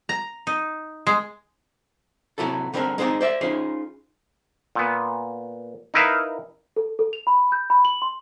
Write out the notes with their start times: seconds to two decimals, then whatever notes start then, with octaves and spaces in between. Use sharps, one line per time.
0.09 A#5
0.47 D#4
1.07 G#3
2.38 C3 F#3 E4 F#4 A4
2.74 D3 G3 C4 D4 G#4 A#4
2.98 G#3 B3 C4 D#4 G#4 D5
3.21 C5 D5 E5
3.41 C#4 D#4 F4 G#4 C5
4.75 A#2 B3
5.94 D#4 E4 A#4 B4 E5 F5
6.76 A4
6.99 A4
7.13 F7
7.27 B5
7.52 G6
7.70 B5
7.85 F#7
8.02 C6